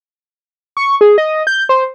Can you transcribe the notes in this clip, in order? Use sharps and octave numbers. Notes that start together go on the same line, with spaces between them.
C#6
G#4
D#5
G6
C5